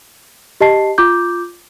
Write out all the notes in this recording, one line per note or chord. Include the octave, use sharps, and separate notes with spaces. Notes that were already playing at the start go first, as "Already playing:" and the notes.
G4 D#5 A5 C7
F4 D6 G6